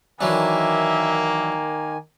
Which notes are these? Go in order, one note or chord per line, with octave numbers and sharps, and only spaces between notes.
D#3 E3 F#3 A#3 D4 E5 G#5